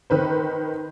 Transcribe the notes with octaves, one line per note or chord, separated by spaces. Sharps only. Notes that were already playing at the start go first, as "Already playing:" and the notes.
D#3 B4 C5